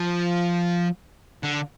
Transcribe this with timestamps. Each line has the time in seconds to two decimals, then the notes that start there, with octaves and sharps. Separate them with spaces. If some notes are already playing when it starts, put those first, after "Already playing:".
Already playing: F3
1.43 D3